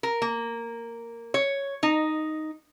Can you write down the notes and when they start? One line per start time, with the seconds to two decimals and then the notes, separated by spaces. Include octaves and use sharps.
0.03 A#4
0.22 A#3
1.34 C#5
1.83 D#4